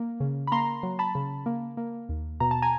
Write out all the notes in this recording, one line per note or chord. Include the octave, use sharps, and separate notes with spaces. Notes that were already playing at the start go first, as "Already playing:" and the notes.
Already playing: A#3
C#3
B5
A#3 A#5 C6
F#3
A5 B5
C#3
A#3
A#3
D#2
B2 A#5
A5
G#5 A#5